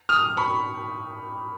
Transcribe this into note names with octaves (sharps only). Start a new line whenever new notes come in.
D#6 F6
B5 C#6